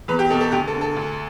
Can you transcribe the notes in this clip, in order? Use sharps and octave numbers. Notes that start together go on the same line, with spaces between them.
E2 B4
G4
B2 A4
A4
D2 G4
A4
D3
A4
D2